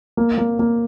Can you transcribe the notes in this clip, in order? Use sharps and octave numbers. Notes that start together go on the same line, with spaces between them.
A#3
A#3
A#3